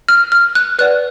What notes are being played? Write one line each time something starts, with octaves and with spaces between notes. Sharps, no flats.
F6
F6
F#6
B4 D5 F#5 F#6